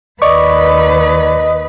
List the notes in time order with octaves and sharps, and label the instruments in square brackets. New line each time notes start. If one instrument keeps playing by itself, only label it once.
[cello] D#2 B4 [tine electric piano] D5 C#6 D6 [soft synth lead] D#5